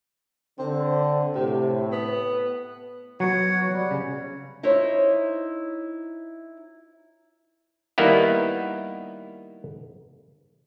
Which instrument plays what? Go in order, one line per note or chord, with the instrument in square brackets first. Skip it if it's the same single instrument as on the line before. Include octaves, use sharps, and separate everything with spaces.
[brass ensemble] D3 [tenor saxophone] C4
[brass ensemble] A2 [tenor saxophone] C3
[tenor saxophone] B3
[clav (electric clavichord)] F#3 B3 [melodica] F#4 C#5 F#5
[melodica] G3
[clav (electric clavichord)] C#3
[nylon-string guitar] D#4 E4 C5 C#5 E5
[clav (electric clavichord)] D#3 G3 A#3 B3 E4